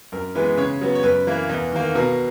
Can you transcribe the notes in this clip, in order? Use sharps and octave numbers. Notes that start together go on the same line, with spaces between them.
F#2 A#4
E3 G#3 B3 B4
C#3 C#5
F#3 B3
C#5
F#2 B4
E3 A#3
E2
D#3 A#3
B2 A#4